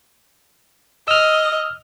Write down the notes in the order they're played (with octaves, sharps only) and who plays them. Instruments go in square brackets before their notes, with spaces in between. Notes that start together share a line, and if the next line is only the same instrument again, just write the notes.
[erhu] D#5 [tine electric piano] E6 F6